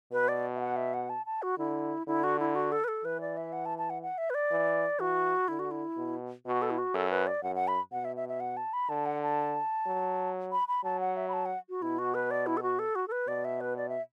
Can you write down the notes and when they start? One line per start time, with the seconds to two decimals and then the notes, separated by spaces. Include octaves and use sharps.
0.12 B2 B4
0.28 D5
0.56 E5
0.61 F#5
0.76 E5
0.94 F#5
1.09 A5
1.26 A5
1.42 F#4
1.58 D3 E4
2.07 D3 E4
2.24 F#4
2.40 E4
2.55 F#4
2.72 A4
2.84 B4
2.88 A4
3.05 E3 B4
3.21 D5
3.37 E5
3.53 F#5
3.66 A5
3.78 A5
3.90 F#5
4.02 F#5
4.18 E5
4.30 B4
4.35 D5
4.51 E3
4.99 E3 F#4
5.48 D3 E4
5.59 F#4
5.71 E4
5.97 B2
6.46 B2 F#4
6.62 A4
6.70 E4
6.78 F#4
6.94 F#2 A4
7.10 B4
7.27 D5
7.43 F#2 F#5
7.55 F#5
7.68 B5
7.92 B2 F#5
8.05 E5
8.16 E5
8.28 E5
8.40 F#5
8.57 A5
8.73 B5
8.89 D3 A5
9.06 F#5
9.22 A5
9.86 F#3
10.52 B5
10.68 B5
10.84 F#3 A5
11.00 F#5
11.17 E5
11.29 B5
11.33 A5
11.46 F#5
11.69 F#4
11.82 B2 E4
11.99 F#4
12.15 B4
12.31 D5
12.47 E4
12.57 A4
12.62 F#4
12.79 A4
12.95 F#4
13.08 A4
13.12 B4
13.27 B2 D5
13.45 E5
13.61 B4
13.77 D5
13.89 E5